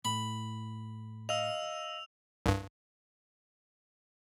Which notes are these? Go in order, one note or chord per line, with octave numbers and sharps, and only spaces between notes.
A2 B5
D#5 F5 E6 F7
C2 G2